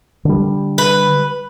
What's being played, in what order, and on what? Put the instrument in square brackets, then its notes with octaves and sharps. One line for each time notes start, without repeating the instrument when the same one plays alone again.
[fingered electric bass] D3 G3
[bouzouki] B4